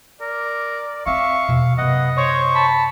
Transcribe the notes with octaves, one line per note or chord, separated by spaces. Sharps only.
A#4 D5
C4 E5 F5 C#6
E2 B2
F#2 C3 B3 D#5 F#5
C5 C#5 C#6
A5 B5